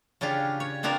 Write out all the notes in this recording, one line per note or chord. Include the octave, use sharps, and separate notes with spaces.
C#3 C#4 D4 F4 G4
C#5
B3 C4 D4 F4 A#4 C5